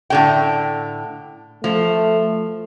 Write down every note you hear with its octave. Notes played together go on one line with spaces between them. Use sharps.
A2 D3 G5
F3 A3